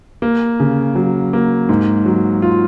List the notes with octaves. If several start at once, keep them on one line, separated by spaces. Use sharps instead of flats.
A#3
C#3
F#3
A#3
G#2
F#3
F4